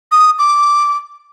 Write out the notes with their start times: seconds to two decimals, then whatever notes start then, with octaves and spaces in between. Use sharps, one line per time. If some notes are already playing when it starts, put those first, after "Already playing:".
0.12 D#6
0.39 D6